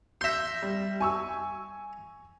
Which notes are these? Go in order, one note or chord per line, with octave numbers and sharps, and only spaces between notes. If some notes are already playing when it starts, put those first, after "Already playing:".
E5 C6 G6 A#6
G3
G#5 C#6 E6